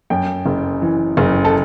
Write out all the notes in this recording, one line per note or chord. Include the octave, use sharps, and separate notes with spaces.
F#2 G5
F#1
E3
F#1
A4